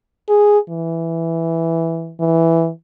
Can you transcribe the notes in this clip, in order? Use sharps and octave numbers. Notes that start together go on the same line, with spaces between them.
G#4
E3
E3